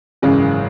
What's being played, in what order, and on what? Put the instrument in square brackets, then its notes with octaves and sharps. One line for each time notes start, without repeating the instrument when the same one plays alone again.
[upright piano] G#1 F#2 C#3 E3 G#3